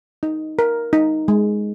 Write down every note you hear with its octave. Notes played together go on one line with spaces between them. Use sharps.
D#4
A#4
D#4
G#3